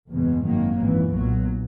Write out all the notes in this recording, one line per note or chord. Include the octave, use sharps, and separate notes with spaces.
F#1 E2 B2 G#3
G#1 F#2 D#3 F#3 A#3
G#1 F#2 E3
B1 A#2 F#3